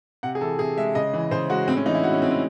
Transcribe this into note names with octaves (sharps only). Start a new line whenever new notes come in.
C3 F#5
G#4
E3 A4
C3 G#4
G#3 E5
C#3 D#5
E3
C#3 C5
G#3 F#4
A2 C4
C#4
E3 D#4
E4
A2 F#4
C#4
G#3 C4
C#4